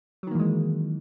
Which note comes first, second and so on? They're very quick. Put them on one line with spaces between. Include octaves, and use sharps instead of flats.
F#3 D#3 A#3 E3 G#3